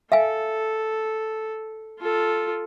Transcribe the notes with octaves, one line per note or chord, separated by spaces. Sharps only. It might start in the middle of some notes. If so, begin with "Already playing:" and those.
A4 E5 F5 G#5
F4 A4